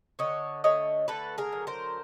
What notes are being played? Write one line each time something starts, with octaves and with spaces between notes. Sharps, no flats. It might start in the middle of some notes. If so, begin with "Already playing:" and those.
D3 C#5 D#5
A3 C#5 D#5
D3 A4 B4
G#4 A#4
F#3
A#4 C5